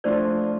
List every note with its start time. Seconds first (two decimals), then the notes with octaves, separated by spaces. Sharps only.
0.04 F3 A3 D4 F4 C5 D5